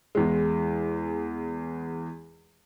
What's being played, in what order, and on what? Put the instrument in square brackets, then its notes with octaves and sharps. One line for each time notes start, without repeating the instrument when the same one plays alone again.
[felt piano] E2 G#3